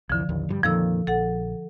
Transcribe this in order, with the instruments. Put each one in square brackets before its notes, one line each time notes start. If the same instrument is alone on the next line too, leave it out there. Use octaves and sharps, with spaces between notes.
[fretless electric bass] C2 F2 E3 [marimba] D3 F3
[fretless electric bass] A1 D#2
G2 F3 G3
[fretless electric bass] F2 A#2 D#3 [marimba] F3 A4 E6
[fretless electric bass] A#1 [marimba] A4 F#5